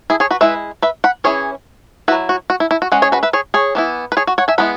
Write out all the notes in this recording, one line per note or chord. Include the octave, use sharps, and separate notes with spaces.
E4 G#4
G#4 C#5
F#4 B4
G#3 E4 B4 E5
B4 E5
F#5 B5
E3 C#4 E4 G#4 C#5
F#3 E4 F#4 B4
F#4
F#4
E4
E4
F#4
G#3 C#4 F#5
G#4 C#5
F#4 B4
B4 E5
G#4 C#5
G#4 C#5
E3 B3 E4
B4
G#4 C#5
F#4
C#5 F#5
E5 G#5
G#3 B3 E4 F#5 B5